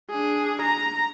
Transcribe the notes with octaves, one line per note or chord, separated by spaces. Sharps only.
D4 G#4
A#5